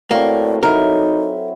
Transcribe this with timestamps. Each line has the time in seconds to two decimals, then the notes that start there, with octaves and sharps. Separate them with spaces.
0.11 A2 A#3 C4 F#4 D5
0.63 F#3 D#4 E4 A4 A#4